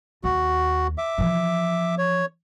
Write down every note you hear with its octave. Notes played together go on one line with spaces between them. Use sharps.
D#2 F#4
E5 D6
E3 F3
C#5